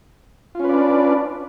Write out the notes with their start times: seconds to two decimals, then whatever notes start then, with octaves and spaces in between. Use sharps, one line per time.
0.55 F4
0.60 C#4
0.64 B4
0.69 D5
0.74 D4